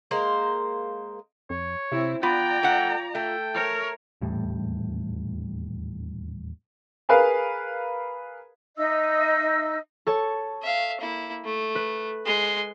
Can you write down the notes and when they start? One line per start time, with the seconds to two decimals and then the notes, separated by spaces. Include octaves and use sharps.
0.11 G#3 A#3 C5
1.50 F2 C#5
1.92 C3 C4 E4
2.23 B3 F4 D5 G5 A#5
2.63 A3 F#5
3.15 A3 G5
3.54 A#4 C#5
4.21 D#1 E2 A2 G3
7.09 G#4 A#4 B4 F5
8.76 D#4 D#5 E5 E6
10.07 A4 C#5 A5
10.62 E5 F5
11.00 A#3 E4
11.45 A3
11.75 B4
12.25 G#3 C6